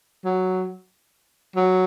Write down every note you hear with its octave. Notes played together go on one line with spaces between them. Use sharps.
F#3
F#3